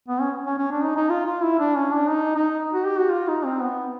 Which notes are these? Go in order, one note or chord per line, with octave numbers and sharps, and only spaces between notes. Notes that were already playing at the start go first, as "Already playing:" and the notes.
B3
C#4
C#4
C#4
D4
D#4
D#4
F4
F4
E4
D4
C#4
D4
D#4
D#4
F#4
G4
F#4
F4
D#4
C4
B3